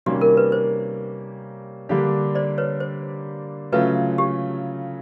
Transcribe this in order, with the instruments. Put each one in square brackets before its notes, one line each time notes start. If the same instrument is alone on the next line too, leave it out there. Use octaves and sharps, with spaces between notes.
[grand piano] C3 D#3 G3 A#3 C#4 [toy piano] F#4
[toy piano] A#4
B4
C5
[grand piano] D3 G3 A#3 D4 G4
[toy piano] C5 D5
B4 C#5
C5
[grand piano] C#3 F#3 A3 C#4 F4 [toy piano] B4
[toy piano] G4